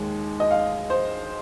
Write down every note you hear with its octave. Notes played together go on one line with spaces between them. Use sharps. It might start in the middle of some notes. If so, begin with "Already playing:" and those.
Already playing: D#2 D#3 G#3
D#5
F5
C5